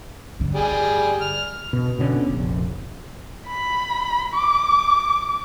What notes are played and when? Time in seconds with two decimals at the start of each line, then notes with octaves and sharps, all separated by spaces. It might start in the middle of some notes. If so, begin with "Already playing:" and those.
0.39 G2 D3
0.54 G3 G#4
1.21 F6
1.73 B2
1.99 B2 D3 C4 C#4
2.27 F1 A#1
3.47 B5
4.34 D6